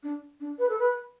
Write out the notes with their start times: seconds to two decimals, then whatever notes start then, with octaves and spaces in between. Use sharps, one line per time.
0.03 D4
0.40 D4
0.59 B4
0.69 A4
0.79 B4